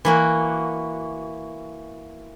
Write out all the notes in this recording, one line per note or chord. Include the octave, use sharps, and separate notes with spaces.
E3 A#3 F#4